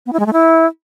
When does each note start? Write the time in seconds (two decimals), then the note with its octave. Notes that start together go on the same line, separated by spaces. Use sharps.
0.06 B3
0.13 E4
0.19 G#3
0.26 A3
0.33 E4